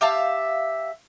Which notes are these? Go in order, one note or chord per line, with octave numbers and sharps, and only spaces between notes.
G4 E5 F5 A5